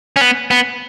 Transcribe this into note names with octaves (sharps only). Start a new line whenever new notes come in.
C#4
B3
B3